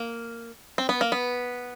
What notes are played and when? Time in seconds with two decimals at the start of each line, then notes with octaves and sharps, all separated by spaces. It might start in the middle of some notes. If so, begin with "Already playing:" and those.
Already playing: A#3
0.78 C4
0.89 B3
1.01 A#3
1.12 B3